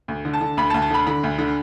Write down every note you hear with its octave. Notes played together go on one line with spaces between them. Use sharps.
D2
D3
A5
D3
D2 B5
A5
D2
A5
D3 B5
D3 B5
D2
D3